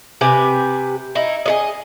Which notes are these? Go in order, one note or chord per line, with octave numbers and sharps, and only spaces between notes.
C3 G4 B4 G#5
D#4 E4
G#4 A4 D#5